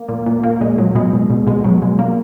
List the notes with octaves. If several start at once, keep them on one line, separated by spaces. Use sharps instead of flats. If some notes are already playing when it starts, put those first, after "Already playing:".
Already playing: A#3
A#2
A#2
A#2 A#3
A#2 G#3
A#2 F#3
B2 G#3
B2
B2
B2 G#3
B2 F#3
B2 G#3
A#2 A#3